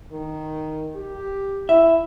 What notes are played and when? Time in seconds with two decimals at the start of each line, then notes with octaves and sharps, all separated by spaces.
0.12 D#3
0.96 G4
1.69 E4 E5